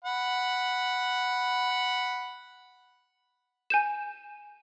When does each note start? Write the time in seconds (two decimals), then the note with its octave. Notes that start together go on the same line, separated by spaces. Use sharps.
0.05 F#5 B5
3.70 G#5 G6 E7